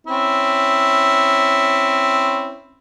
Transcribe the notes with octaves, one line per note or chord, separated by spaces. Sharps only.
C4 C#4 E4